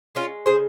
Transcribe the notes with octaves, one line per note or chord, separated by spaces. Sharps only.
G#3 C#4 F4
C#3 G#4 C5